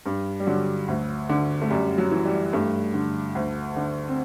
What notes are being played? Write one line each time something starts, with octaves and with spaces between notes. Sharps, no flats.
G2
G3
D3 F#3
D2
D3
A3
F#2 G3
F#3
E3
G3
G2 A3
D3
D2
D3
C4